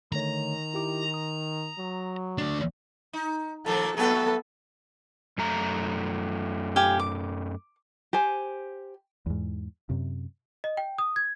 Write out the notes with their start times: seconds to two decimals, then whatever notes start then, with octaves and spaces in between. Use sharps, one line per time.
0.12 D3 D#3 A3 C#5 A#5
0.74 E4 G4 D6
1.14 D#6
1.78 F#3
2.38 D2 D4
3.13 D#4
3.66 A#2 D#3 F3 A4
3.97 F#3 A3 B3 A4 B4
5.38 F#2 A3 A#5
6.76 G4 F5 G#5
7.00 D6
8.13 G4 C5 G#5
9.26 E2 G#2
9.90 F#2 C3
10.64 D#5
10.77 G5
10.98 D#6
11.16 G#6